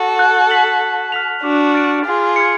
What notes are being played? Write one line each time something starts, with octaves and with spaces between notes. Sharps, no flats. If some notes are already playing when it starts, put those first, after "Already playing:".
Already playing: F#4 A4
F#6
B6 F#7
A5
F6 B6 F7
D4 F#4 D6
F6 A6 D7
F4 G#4 F6
G#6 C#7